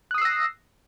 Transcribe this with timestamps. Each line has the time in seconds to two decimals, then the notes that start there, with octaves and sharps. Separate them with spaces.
0.11 F#6
0.14 D#6
0.18 C7
0.22 E6
0.25 A#6